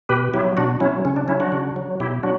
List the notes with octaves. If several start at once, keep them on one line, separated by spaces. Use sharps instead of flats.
B2 G4 B4
F#3 E4 G4
B2 D4 F#4
F#3 C#4 E4
C#3 C#4
D4
F#3 C#4 E4
D4 F#4
C#3
F#3
B2 E4 G4
F#3 D4 F#4